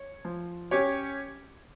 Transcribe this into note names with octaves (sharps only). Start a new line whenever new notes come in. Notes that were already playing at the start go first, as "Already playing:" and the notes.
Already playing: C#5
F3
C#4 G4 C#5